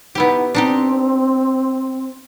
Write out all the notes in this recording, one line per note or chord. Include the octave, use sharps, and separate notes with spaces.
B3 D#4 E4 G4
C4 D4 D#4 G4